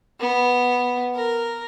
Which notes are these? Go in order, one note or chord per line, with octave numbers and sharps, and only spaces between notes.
B3
A#4